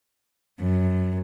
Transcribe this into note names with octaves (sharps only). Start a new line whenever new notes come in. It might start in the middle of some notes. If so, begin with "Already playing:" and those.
F#2